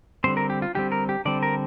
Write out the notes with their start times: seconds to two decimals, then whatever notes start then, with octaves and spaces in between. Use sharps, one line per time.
0.24 D3 G3 C4 C5
0.37 A#4
0.50 G4
0.62 F4
0.75 D3 G3 C4 G4
0.92 A#4
1.09 G4
1.25 D3 G3 C4 D5
1.43 A#4